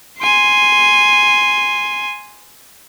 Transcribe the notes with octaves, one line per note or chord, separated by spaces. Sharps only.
G#5 C6